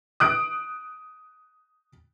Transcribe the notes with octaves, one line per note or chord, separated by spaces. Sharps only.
D#6 F#6 D7